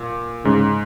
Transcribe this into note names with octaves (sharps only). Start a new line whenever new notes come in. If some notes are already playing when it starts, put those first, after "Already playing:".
Already playing: A#2
G#2 C#3